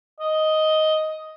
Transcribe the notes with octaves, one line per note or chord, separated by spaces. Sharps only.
D#5